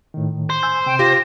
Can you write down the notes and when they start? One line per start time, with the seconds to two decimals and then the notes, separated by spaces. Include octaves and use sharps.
0.14 A2 D#3
0.50 C5
0.63 G#5 E6 G6
0.86 C3 G5
0.99 F4 G4 A#6